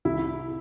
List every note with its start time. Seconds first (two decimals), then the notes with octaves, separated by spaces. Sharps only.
0.05 C2 E4